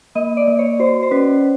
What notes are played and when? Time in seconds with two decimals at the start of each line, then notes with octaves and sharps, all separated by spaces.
0.15 A#3 D#5
0.37 D5
0.47 A#3
0.59 C#5
0.79 F#4 C5
1.03 C5
1.11 C#4 B4